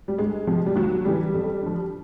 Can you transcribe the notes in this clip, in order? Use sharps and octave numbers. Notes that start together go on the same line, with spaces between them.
G3
D2 G#3
C3 F3
G3
D#2 F#3
C#3 E3 G3
F2
D3 F3